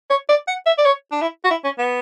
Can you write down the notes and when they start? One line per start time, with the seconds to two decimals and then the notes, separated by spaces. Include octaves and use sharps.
0.10 C#5
0.29 D5
0.48 F#5
0.66 E5
0.78 D5
0.85 C#5
1.12 D4
1.22 E4
1.44 F#4
1.50 E4
1.64 C#4
1.78 B3